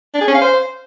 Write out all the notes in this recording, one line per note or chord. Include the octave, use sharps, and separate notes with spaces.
D4
G#4
C#4
F5
C5